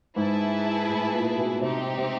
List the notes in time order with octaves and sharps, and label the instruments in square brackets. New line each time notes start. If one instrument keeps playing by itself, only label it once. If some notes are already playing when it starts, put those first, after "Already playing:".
[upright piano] G#2 [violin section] E4 G#4 B4 E5 A5
[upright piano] A2
A#2
B2
[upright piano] C3 [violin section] C4 D#4 G4
[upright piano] C3